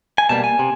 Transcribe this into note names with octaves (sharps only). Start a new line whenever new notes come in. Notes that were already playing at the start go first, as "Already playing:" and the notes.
G#5
B2 G3 A#3 A5
G#5
C3